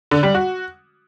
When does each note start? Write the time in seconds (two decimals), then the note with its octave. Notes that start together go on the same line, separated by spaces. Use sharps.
0.11 D3
0.23 G3
0.34 F#4